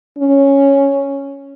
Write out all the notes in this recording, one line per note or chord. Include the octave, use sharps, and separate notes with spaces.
C#4